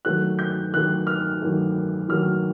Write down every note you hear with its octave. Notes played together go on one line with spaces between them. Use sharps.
D#3 F#3 A3 F#6
G6
D#3 F#3 A3 F#6
F6
D#3 F#3 A3
D#3 F#3 A3 F6